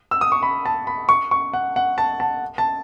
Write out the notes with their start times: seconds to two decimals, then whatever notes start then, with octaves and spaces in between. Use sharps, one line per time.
0.11 E6
0.21 D#6
0.32 C#6
0.43 B5
0.66 A5
0.87 B5
1.09 C#6
1.31 C#6
1.53 F#5
1.76 F#5
1.98 A5
2.20 A5
2.58 A5